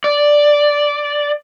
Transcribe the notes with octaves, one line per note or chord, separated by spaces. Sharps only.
D5